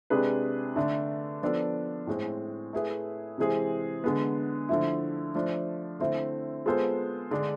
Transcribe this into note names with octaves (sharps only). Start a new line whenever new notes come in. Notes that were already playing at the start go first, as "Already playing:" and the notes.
C3 G#3 D4 G#4 B4
D3 A3 D4
F3 B3 D4 A4
A2 G#3 C4
A3 E4 G#4 B4
C3 E3 G#3 C4 G#4
D3 G#3 B3
D3 F3 A3 E4
F3 A3 D4
D3 A3 C4 E4
G#3 B3 F4 A4 C5
D3 G#3 D4